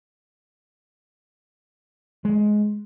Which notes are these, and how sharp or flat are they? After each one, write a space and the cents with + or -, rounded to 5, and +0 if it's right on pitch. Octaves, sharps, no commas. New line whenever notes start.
G#3 +15